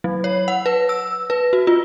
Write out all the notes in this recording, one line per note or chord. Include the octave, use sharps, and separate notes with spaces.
F#3
C#5
F#5
B4
E6
B4
F#4
F4